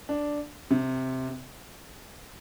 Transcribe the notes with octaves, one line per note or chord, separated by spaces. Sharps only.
D4
C3